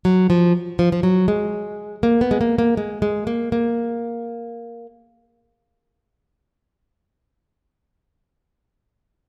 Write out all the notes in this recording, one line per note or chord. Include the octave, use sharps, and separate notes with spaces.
F#3
F3
F3
F3
F#3
G#3
A#3
B3
G#3
A#3
A#3
G#3
G#3
A#3
A#3